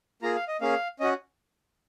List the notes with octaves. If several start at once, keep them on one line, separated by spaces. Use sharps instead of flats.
A#3 F4 G#4 A#5
F5
D#5
A#3 C#4 G#4 F5
C#4 F#4 D#5